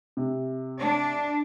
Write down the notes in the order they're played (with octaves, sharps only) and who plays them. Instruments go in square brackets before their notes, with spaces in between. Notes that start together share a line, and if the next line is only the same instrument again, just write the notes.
[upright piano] C3
[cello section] D4